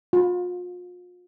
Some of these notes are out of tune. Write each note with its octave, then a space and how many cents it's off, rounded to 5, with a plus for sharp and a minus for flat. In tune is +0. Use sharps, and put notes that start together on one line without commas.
F4 +40